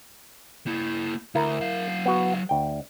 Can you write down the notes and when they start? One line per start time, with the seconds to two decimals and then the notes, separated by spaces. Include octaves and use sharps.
0.67 A#3 E4
1.35 D2 E4 A#4
1.61 F#3 F5
2.06 B3 F#4
2.49 D2 G5